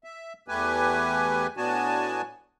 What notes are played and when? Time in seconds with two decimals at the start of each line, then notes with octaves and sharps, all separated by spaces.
0.04 E5
0.48 E2 A3 G4 B4 G#5
1.57 A2 B3 D4 F#4 G#5 A5